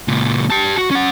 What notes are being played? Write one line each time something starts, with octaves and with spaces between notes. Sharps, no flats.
C#2 A#2
G4 A5
F#4
C#4 F#5